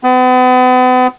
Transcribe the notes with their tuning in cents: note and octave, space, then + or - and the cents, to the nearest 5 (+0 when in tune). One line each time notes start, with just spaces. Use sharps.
B3 +40